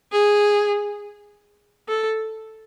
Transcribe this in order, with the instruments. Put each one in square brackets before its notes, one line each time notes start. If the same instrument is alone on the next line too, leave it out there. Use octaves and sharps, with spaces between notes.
[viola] G#4
A4